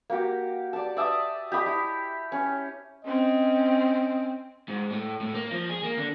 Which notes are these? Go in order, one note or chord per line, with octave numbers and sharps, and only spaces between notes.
A#3 F#4 G4
D5 A5
D5 E5 A5 D#6
G4 D#5 B5
E4
C#4
C4 C#4 D#5
G#2
A2
A2
A#3
F3
G#4
A#3
D3